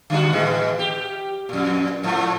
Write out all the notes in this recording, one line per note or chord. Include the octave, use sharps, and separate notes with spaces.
D3 G3 F#4
A2 E3 G#3
G4
F2 A#2
G#2 F3 A3